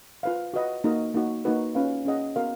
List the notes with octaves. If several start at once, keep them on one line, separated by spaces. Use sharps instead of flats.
F4 B4 F5
F#4 B4 D#5 F#5
A#3 D#4 F#4 A#4 D#5
A#3 D#4 F#4
A#3 D#4 F#4 B4
C#4 F4 B4 F5
C#4 G#4 D#5 F#5
B3 F#4 A#4 F5